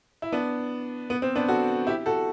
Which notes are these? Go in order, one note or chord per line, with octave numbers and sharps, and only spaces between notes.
E4
B3 D4
B3
C4
B3 D4
F#4 A4
E4 G4
F#4 A4